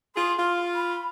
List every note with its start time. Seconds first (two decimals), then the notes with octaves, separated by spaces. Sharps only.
0.16 F4 G#4 C6
0.38 F4
0.75 B5